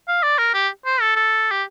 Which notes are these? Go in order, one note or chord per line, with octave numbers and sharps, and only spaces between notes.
F5
D5
A#4
G4
C5
A4
A4
G4